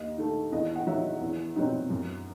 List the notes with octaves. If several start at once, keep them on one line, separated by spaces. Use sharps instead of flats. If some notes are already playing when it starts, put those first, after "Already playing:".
Already playing: D#2 D#5
D#3 A3
E2 D#5
F#5
D#3 F#3 E5
E2
B2 F#3 C4 D#4
F#2